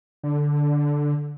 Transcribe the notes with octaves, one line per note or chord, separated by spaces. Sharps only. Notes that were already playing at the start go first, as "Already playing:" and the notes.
D3